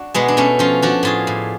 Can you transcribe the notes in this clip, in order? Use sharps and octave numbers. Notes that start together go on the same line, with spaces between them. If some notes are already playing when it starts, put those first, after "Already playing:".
Already playing: D4 F#4
B2 G#3 B3
D4
B2 A3 C#4
F3 C#4 F4
F3 D4 F#4
A2 F4 G#4
A2